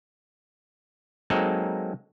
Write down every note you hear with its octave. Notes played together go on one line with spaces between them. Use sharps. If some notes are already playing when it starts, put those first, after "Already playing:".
F#3 G#3 A#3 C4 D#4 A4